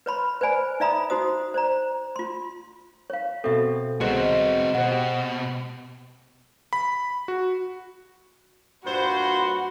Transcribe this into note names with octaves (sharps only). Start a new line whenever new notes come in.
B4 C#5 B5 C6
B4 C5 D5 G#5 B5
D#4 D5 E5 A#5 B5 D#6
D#4 F#4 C5 D#6
C5 D5 A#5
F4 C6
C#5 F5
B2 C4 A4 E5
C2 G#3 B3 C4 F#4 C5
B2 C5 F#5
G4
B5
F#4
G2 A#2 F#4 B4 C5